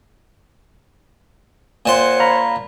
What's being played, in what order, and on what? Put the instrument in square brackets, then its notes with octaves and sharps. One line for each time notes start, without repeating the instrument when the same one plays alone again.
[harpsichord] A#2 A5 C6 [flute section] C5 C#5 F#5
[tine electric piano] F5 A#5 B5